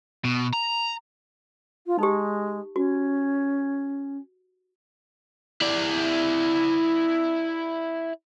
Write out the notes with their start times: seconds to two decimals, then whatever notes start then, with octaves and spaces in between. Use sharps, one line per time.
0.25 B2
0.54 A#5
1.86 F4
1.99 G#3 D#4 G4
2.76 C#4 F#4
5.62 E4 D5